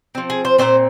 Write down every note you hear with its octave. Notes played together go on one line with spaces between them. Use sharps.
F3 C4
G#4
C5
A#2 G#3 C4 C5